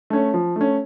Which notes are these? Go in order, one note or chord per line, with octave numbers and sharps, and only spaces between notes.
A3 C#4
F3
A3 C#4